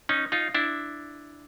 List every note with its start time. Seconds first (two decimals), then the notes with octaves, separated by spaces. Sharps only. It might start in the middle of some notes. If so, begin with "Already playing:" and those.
0.09 C#4 D#4
0.32 D#4 F4
0.55 D4 E4